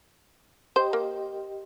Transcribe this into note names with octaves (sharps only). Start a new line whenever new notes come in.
G4 C5 D#5 G5
A#3